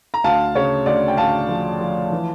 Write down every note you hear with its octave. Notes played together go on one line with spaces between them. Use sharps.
A#5
D2 F5 A5
C#3 C#5
D2 D5
G5
D2 F5 A5
F3
F3
E3